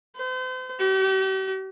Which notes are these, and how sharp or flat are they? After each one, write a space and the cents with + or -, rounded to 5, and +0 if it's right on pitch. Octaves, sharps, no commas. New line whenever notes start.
C5 -40
G4 -45